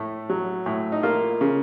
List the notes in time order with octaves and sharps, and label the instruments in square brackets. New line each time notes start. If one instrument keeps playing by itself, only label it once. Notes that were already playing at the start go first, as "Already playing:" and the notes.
Already playing: [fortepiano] A2 A3
F#3
A2
D#4
A#3 F4
C#3